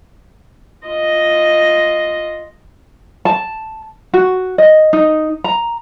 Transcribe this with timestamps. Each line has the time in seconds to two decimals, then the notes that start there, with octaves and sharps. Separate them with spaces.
0.87 F4 D#5
3.25 A5
4.14 F#4
4.58 D#5
4.93 D#4
5.44 A#5